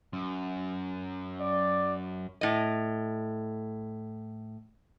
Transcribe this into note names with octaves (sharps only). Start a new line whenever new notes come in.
F#2
D5
A2 D#5